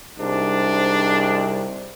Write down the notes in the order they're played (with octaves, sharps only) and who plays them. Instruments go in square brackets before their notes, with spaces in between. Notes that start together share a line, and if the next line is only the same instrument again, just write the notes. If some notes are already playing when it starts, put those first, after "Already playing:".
[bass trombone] C2 [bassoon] G#2 [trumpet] D4